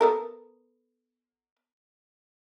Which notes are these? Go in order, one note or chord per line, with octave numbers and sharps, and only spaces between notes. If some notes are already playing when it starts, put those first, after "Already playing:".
B3 A4 A#4